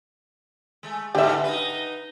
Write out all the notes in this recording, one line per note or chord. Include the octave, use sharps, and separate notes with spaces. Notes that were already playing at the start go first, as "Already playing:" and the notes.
G#3 A3
G#2 B2 D3 G4 E5
D#4 B4